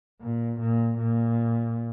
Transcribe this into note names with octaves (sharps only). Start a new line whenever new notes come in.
A#2
A#2
A#2